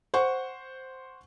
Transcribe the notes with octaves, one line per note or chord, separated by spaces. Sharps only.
C5 F#5 C#6